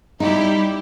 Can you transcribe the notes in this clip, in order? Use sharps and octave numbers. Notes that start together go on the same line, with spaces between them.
G3 D#4 E4 G4